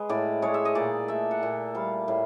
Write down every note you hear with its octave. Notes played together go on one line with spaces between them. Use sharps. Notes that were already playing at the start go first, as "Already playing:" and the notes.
Already playing: G#3 B4
A2 D5
G#3 C#5
E5
D#5
A#2 D5
A3 E5
F#5
A#2
G3 F5
A2